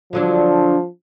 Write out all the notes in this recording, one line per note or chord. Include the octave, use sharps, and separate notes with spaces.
D3 F3 F#3 D4